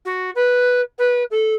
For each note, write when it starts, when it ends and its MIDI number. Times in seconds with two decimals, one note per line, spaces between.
0.05 0.30 66
0.35 0.81 71
0.98 1.23 71
1.31 1.55 69